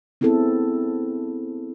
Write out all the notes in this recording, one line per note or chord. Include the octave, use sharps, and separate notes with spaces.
B3 C4 E4 G#4 A4